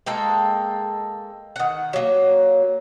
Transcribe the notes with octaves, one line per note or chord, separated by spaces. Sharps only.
G#3 A#3 A4 G5
D#3 F#5
F#3 A#3